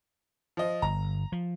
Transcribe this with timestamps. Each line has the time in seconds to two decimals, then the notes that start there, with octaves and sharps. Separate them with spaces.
0.57 F3 D#5
0.82 G1 A#5
1.32 F3